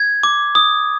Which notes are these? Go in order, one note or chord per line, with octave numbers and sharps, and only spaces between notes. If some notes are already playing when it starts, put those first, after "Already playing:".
Already playing: G#6
D6
D#6